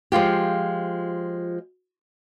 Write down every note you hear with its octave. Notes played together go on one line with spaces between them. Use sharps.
F3 G#3 F4 G4